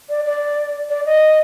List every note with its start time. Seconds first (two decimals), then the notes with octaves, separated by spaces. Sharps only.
0.09 D5
0.26 D5
0.90 D5
1.06 D#5